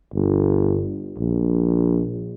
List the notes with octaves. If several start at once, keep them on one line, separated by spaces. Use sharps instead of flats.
G1
A#1